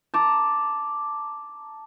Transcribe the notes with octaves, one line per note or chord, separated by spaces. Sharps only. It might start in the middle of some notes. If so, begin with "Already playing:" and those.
A5 A#5 D6